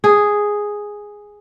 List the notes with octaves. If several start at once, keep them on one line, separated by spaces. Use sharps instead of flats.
G#4